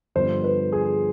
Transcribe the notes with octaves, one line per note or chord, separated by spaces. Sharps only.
G2 D3 F3 B3 C5
B4
G#4